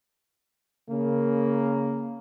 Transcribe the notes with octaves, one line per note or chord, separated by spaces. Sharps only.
C#3 A#3